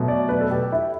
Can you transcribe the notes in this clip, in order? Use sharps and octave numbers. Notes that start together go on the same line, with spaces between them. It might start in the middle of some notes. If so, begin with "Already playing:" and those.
Already playing: B2 F#3 A3
D5
B4
A4
G4
E4